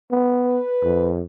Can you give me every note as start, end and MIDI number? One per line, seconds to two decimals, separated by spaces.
0.11 0.59 59
0.46 1.09 71
0.83 1.23 41